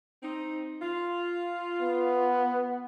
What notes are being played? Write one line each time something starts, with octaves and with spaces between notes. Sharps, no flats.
C4 D#4
F4
B3